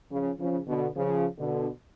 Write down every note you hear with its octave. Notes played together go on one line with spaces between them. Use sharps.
C#3 F3
C#3 F3
B2 D3
C#3 F3
B2 D3